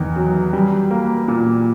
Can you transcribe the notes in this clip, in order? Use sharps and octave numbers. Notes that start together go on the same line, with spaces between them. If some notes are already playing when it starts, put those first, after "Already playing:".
Already playing: E2 D#3
F#3
G3
A#3
A#2